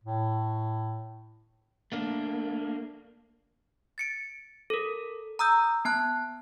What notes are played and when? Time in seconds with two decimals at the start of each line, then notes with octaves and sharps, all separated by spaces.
0.04 A2
1.92 A3 A#3 D4
3.98 A6 C#7 D7
4.70 A4 A#4
5.39 A#5 D#6 E6 G6
5.85 B3 A5 F#6